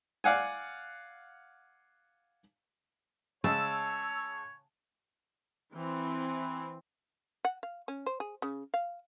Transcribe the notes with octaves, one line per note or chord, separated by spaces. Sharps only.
D5 F5 F#5 G#5
C#3 G#3 C#5 A5 E6
E3 C4
F#5
F5
C#4
C5
G#4
C#3
F5